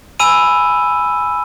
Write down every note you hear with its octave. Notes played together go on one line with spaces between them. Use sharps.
G#5 B5 E6 D#7